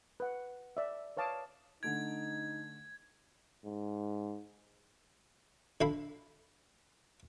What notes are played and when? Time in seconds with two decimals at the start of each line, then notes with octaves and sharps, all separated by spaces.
0.20 B4 F#5
0.77 D5 E5
1.17 B4 C#5 F5 A5 D6 D#6
1.83 D3 A3 D#4 G#6 D7
3.65 G#2
5.81 D3 E4 F5 B5